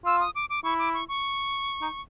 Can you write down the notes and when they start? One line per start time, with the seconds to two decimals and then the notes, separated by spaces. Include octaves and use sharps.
0.05 F4 E6
0.20 D#6
0.35 D6
0.50 D6
0.64 E4 C#6
0.79 D6
0.94 C#6
1.09 C#6
1.82 D#4